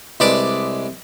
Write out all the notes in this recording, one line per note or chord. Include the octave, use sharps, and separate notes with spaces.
C2 G#3 B4 D5 A5 D6